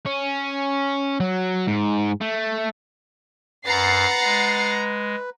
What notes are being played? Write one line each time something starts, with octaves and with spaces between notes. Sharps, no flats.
C#4
F#3
G#2
A3
F#2 B4 F#5 A#5 A6 C7
G#3